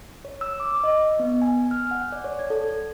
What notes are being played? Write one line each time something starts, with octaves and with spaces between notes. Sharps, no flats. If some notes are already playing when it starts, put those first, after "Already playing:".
C#5
E6
D6
D#5
B3
G#5
F6
F#5
D5
C#5
G#6
A4